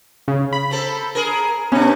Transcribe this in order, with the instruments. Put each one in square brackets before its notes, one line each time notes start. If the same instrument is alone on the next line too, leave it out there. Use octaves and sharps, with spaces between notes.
[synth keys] C#3
B5
[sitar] C4 A4
G#4 A#4
[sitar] C3 D4 [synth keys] B3 C#4